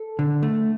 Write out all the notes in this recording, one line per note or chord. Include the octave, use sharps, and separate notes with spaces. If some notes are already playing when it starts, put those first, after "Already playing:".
Already playing: A4
D3
A3